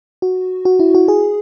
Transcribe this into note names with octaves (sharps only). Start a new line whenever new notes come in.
F#4
F#4
E4
F#4
G#4